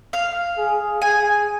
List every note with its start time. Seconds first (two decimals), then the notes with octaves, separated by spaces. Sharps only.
0.13 F5
0.58 G#4
1.02 G#4 G#5